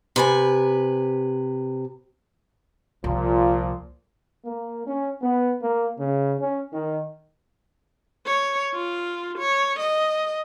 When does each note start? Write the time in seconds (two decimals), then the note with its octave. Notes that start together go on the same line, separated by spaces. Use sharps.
0.16 C3 B4 G#5
3.04 C2 A#2 F3
4.45 A#3
4.87 C#4
5.21 B3
5.62 A#3
5.99 C#3
6.39 C#4
6.72 D#3
8.26 C#5
8.75 F4
9.39 C#5
9.80 D#5